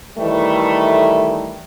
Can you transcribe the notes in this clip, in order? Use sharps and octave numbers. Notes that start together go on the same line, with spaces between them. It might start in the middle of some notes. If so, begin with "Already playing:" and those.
D#3 E3 G3 A3